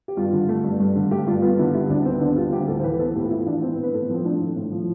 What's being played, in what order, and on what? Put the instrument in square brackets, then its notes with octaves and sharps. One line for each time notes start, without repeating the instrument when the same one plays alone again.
[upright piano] G4
G2 F4
D3
A3
G2
G2
D3
A3 G4
G2 F4
B3 F4
D3 E4
G3 E4
D2 D4
B3 C4
D3 D4
G3 F4
D2 G4
A2 A4
C5
E3 B4
B3 A4
A2 G4
F4
A2 E4
E3 D4
B3 C4
B4
A2
B4
A2 A4
B3
F3 C4
A3 D4
A2
A2
F3